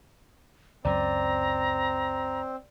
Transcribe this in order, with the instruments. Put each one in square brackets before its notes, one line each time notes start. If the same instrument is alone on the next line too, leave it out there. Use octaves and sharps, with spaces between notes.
[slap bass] C#2 F#2 F#3 [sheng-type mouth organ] C4 [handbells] D5 [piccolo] A#5